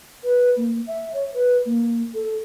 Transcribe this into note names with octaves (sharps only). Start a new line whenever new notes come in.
B4
A#3
E5
C#5
B4
A#3
A4